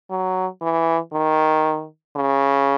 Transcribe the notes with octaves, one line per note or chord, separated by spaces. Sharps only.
F#3
E3
D#3
C#3